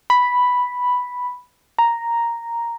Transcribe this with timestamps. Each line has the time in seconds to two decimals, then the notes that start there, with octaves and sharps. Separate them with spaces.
0.10 B5
1.79 A#5